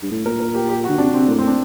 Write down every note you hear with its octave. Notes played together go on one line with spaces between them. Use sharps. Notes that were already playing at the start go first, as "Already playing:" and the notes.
G2
A2
A#2 A#4
A#4
G4
G4
F#4
D3
C3 D4
C3 C4
A2 A#3
C4
D4